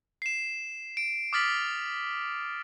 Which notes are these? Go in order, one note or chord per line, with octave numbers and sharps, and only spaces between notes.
C7 E7
D7
D6 D#6 F6 A6 B6 F#7